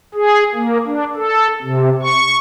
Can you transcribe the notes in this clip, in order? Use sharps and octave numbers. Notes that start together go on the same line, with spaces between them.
G#4
A#3
D4
A4
C3
C#6